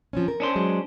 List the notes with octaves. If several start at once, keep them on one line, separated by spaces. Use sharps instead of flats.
F3 C4 C#4
A#4
C#4 D4 C5
F#3 G#3